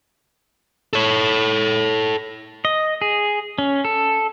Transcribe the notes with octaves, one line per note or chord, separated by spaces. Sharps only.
A4 C#5
D#5
G#4
C#4
A4